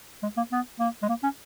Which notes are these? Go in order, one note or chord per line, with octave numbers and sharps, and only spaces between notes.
G#3
A#3
B3
A#3
G#3
A#3
C#4